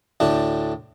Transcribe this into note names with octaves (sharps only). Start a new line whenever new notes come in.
D2 A2 D4